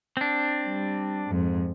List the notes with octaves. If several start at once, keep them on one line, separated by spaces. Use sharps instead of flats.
C4 D4
G3
F2 G#2